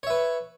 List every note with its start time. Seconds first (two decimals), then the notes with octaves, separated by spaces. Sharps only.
0.03 C#5
0.07 E5
0.10 B4